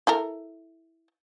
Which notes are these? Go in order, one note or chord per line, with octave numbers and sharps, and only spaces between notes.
E4 A4 A#4